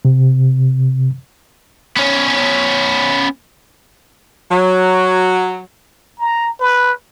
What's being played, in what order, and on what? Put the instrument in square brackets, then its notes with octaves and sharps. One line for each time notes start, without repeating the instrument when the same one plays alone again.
[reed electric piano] C3
[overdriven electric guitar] B3 C#4
[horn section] F#3
[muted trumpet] A#5
B4